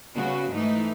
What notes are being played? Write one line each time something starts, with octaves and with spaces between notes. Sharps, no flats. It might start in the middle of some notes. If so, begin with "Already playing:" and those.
C#3 G3 B3 F#4
G#2 E3 A3 D#4